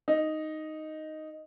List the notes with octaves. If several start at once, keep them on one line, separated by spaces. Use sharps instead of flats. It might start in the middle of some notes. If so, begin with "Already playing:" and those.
D#4